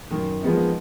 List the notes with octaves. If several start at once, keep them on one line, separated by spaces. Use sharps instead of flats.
F#2 D#3
F3 G#3 B3 D#4